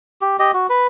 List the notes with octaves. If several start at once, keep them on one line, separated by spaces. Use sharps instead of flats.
G4
G4 D#5
F#4
B4